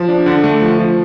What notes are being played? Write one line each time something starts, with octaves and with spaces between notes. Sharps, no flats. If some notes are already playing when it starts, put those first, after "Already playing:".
Already playing: F3
D4
D3
A3
F3
F3